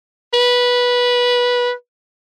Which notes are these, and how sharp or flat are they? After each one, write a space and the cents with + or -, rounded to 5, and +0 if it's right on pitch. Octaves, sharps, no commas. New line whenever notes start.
B4 -15